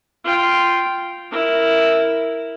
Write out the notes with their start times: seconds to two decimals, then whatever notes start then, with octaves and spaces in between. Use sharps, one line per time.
0.24 F4 G5
1.31 E4 A#4